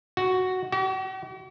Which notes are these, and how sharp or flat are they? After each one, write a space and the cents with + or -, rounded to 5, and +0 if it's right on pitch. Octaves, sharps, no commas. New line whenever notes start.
F#4 +0
F#4 +45